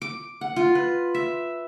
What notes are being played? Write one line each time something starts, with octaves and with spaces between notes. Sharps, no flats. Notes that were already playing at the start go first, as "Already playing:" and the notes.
D6
F#5
F4
B4
E5